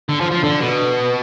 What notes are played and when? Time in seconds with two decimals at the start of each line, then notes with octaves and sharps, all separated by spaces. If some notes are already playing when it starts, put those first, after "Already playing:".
0.09 D3
0.21 F3
0.31 F3
0.43 D3
0.60 B2